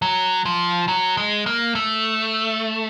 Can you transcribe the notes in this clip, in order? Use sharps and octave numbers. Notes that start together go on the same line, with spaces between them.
F#3
F3
F#3
G#3
A#3
A3